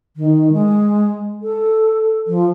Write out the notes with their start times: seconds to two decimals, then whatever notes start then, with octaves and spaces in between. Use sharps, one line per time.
0.16 D#3
0.53 G#3
1.42 A4
2.27 F3